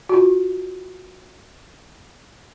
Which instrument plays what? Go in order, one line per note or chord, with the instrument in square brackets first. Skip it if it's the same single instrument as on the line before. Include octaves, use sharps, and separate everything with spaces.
[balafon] F4 F#4